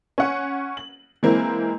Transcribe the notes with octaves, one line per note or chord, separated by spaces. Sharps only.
C#4 F#5
F#7
E3 G#3 A#3 C4 E4